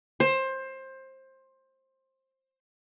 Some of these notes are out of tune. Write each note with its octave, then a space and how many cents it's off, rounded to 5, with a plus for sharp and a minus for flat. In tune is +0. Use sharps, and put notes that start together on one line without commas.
C5 +20